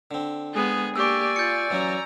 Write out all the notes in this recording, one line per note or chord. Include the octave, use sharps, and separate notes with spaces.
D3 C4
G#3 B3 G#4
A#3 G4 D5 G#5 C#6 E6
F4 G6 A6 C#7
E3 F#3 C#4 A#5